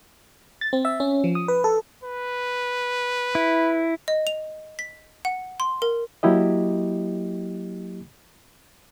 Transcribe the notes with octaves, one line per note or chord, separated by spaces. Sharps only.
A6
C4
E5
C#4
F3
D#6
B4
A4
B4
E4
D#5
F7
B6
F#5
C6
A#4
F#3 A#3 E4 G4 D#5